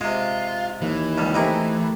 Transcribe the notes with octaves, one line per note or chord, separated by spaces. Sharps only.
C3 G#3 F4
D#2 E3
C#2 G3
A3 C4 D#4 E4 G4 A#4